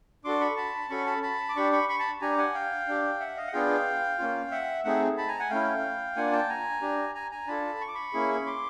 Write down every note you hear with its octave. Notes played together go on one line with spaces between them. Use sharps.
D4 F#4 A4 C6 D6
B5 C#6
A5 B5
C#4 F#4 A4 B5 C#6
A5 B5
A5 B5
D6
D4 G4 B5 C#6
B5 C#6
B5 C#6
A5 B5
D4 G4 G#5 A#5
F#5 G#5
F5 G5
D4 G4
E5 F#5
D#5 F5
F#5
B3 D4 F4 G#4 F5 G5
A#3 C#4 F4
E5 F#5
A3 C4 D#4 G#4 E5 F#5
A5 B5
G#5 A#5
F#5 G#5
A3 C#4 E4 F5 G5
A#3 D4 F4 F#5 G#5
G5 A5
G#5 A#5
D4 G4
G#5 A#5
G#5 A#5
D4 F4 A4 A5 B5
C#6
D6
B5 C#6
A#3 C#4 E4 G#4
C6 D6